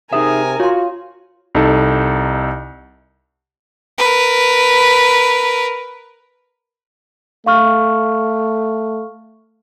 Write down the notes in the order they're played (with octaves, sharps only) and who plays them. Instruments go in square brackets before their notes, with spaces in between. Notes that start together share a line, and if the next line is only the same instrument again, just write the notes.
[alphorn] C3 [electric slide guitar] D#4 G#4 E5 [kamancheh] A#4 G#5 [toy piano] D#6
[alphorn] F4 [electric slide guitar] F#4 [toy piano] C#5 C6
[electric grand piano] C2 D#4 A4
[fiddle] A#4 B4
[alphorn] A3 [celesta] F5 C#6 F6